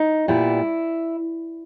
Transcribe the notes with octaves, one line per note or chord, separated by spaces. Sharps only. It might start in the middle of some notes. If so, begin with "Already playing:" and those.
Already playing: D#4
A#2 G3 B3 E4